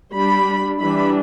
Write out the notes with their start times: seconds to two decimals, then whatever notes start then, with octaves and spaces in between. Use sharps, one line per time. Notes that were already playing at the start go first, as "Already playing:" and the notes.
0.16 G3 D4 B5
0.80 E3 G3 D4 B5